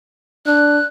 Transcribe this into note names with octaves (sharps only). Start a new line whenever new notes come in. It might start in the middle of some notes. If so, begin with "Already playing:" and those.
D4 F#6